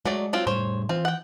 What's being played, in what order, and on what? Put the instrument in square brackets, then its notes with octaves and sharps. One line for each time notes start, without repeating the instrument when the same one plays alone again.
[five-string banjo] F#3 A3 D5 [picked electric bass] G#3
[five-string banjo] F#3 C4 F4
[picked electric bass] A2 G3 A3 [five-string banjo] C5 C#5
[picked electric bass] E3 [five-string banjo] C4 F4
[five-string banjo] F#5 G5